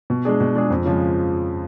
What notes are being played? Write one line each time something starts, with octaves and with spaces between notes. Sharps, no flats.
B2
G#3 D4 G#4
B2
G#3 D4 G#4
F2
C#3 F3 G#3